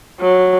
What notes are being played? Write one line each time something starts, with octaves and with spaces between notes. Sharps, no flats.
F#3